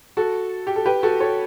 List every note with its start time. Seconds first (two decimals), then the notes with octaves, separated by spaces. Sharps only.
0.17 F#4 A4
0.67 G4
0.76 A4
0.86 G4 B4
1.03 F#4 A4
1.20 A4 C#5